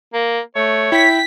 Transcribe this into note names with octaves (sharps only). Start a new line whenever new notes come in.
A#3
A3 C#5
E4 G5 B6